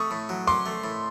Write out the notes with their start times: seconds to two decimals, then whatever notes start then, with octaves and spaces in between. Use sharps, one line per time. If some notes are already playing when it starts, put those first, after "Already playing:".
Already playing: A3 C#6 D#6
0.11 A2
0.29 F#3
0.47 C#4 C6 D6
0.66 A3
0.84 A2